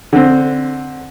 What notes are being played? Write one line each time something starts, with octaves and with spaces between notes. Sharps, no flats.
D3 C4